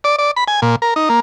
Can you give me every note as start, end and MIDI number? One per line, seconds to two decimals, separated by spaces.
0.04 0.16 74
0.18 0.31 74
0.36 0.44 83
0.48 0.60 80
0.62 0.76 46
0.82 0.94 70
0.96 1.09 63
1.09 1.20 58